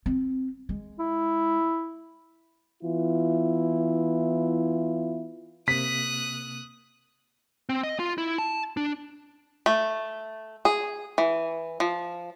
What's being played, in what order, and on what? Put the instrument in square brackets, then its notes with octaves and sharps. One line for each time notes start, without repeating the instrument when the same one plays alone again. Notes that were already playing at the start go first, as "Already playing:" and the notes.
[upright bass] C4
G#3
[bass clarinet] E4
[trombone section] E3 B3 E4 F4
[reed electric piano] C3 A#3 [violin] D#6 F#6 [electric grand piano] B6
[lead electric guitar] C4
D#5
F4
E4
A5
D4
[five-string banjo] A3
G#4
E3
F3